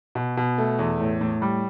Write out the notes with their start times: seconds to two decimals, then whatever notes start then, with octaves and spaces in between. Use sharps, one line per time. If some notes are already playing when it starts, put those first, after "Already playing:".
0.15 B2
0.37 B2
0.58 A3
0.79 E2
1.00 A2
1.21 A2
1.42 G3